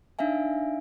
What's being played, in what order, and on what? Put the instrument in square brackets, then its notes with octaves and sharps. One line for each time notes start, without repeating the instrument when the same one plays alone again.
[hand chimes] D4 D#4 E5 F5 G#5